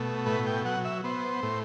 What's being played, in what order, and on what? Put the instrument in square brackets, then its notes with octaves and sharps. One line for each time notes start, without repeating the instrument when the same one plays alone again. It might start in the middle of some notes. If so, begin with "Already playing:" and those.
Already playing: [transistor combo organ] B2 A3
A2 B4
G5
F#3 F#5
E5
B3 C5
A2